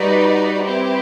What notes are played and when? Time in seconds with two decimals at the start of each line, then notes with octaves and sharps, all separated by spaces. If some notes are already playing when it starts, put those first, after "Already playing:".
Already playing: G3 D#4 F#4 B4 D5
0.62 C4 E4 G4 B4